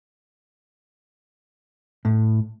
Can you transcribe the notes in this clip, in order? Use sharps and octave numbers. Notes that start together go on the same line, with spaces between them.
A2